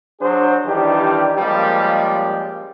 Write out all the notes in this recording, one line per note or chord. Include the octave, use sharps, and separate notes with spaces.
F#3 D4 G#4 C5
D#3 E3 G3 D4 G4
F3 G3 G#3 A#3 C#4